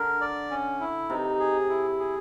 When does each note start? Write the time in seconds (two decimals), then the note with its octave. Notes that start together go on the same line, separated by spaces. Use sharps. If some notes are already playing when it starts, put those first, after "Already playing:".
Already playing: D3 A#4
0.21 D5
0.51 C#4
0.80 E4
1.10 C3 D#4
1.39 G#4
1.69 E4
1.99 G#4